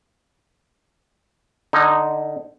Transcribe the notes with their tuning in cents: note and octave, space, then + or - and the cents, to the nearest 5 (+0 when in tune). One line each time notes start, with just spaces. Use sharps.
D3 +20 D#4 +0